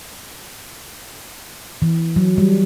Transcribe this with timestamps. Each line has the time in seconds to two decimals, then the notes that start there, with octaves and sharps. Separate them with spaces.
1.82 E3
2.16 F#3
2.38 G3